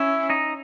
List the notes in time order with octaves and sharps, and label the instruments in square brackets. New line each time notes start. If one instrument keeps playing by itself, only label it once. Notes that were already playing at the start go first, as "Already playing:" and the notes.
Already playing: [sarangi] C#4 [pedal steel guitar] E4 E5
[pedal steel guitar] D#4 D#5